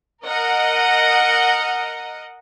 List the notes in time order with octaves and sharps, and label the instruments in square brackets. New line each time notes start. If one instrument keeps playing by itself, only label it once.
[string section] A#4 D#5 F#5